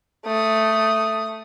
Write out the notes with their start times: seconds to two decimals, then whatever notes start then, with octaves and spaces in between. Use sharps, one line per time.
0.25 A3 D#6